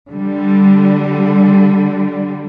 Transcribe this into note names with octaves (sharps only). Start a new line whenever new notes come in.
D3 G3